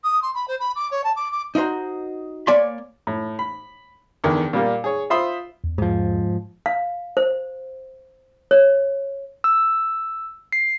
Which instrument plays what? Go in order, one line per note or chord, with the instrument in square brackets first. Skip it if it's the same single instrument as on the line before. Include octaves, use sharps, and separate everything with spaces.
[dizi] D#6
C6
B5
C5
B5
D6
C#5
A5
D6
D6
[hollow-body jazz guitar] D#4 E4 F#4 C5 A#5
A#3 C#5 D5 G#5 B5 C6
[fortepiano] A2
B5
E2 D3 D#3 G5
A#2 G3 A#3
G#4 C#5
F4 C5 E5 B5 C6 D#6
[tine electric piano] E2
[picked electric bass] G#2 F3
[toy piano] F5
C5
C#5
[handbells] E6
C7